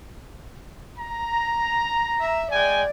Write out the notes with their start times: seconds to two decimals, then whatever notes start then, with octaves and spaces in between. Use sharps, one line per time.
0.98 A#5
2.20 E5
2.51 G#3 D5 G5 G#5